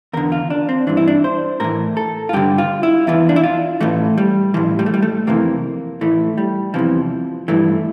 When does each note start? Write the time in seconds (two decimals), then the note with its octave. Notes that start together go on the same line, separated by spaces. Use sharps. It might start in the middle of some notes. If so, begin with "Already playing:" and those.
0.13 E2 D3 A#4
0.32 F4
0.50 D4
0.69 C4
0.87 G2 E3 D4
0.97 E4
1.08 D4
1.24 C5
1.60 A2 E3 A#4
1.97 A4
2.29 F4
2.33 G2 D3 G4
2.58 F4
2.83 E4
3.07 E2 E3 F4
3.29 D4
3.36 E4
3.44 F4
3.80 A2 E3 A3
4.18 G3
4.54 A2 E3 F3
4.79 G3
4.86 A3
4.94 G3
5.02 A3
5.27 F2 C3 E3 A#3
6.01 A2 E3 A3
6.38 G3
6.74 E2 C3 E3 F3
7.48 G2 E3 A3